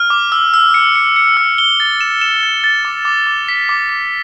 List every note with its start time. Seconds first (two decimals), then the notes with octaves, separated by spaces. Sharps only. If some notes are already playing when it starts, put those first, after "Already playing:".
Already playing: F6
0.10 D6
0.32 E6
0.54 E6
0.74 C#7
0.96 C#7
1.16 C#7
1.37 E6
1.58 G7
1.80 A6
2.01 E7
2.21 E7
2.43 A6
2.64 A6
2.85 D6
3.05 D6
3.27 D6
3.48 B6
3.69 D6
3.89 D6